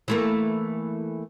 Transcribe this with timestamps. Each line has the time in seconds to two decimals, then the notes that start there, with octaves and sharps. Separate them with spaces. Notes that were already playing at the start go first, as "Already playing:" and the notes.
0.08 E3 A3 A#3